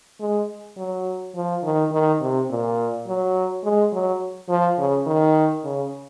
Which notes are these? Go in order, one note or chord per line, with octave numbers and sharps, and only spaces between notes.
G#3
F#3
F3
D#3
D#3
C3
A#2
F#3
G#3
F#3
F3
C#3
D#3
C#3